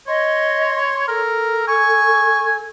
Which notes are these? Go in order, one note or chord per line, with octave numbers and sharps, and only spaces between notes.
C#5 D#5 C6
A4 A#4
G#5 C#6